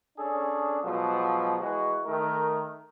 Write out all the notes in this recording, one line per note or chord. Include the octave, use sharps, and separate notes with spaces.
C#4 D4 G#4 A4
B2 F3 F#3 G#3
E3 G#3 F#4
D#3 A3 A#4